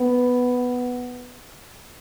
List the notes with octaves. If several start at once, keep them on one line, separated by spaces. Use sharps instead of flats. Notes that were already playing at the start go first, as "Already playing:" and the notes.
Already playing: B3